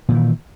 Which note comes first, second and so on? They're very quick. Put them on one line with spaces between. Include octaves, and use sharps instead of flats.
A#2 D#3 E3